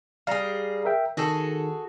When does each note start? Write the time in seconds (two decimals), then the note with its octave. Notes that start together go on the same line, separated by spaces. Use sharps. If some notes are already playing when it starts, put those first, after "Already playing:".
0.27 G3 G#4 F5 A#5
0.85 A#4 E5 G5
1.17 D#3 F#4 G#4 A4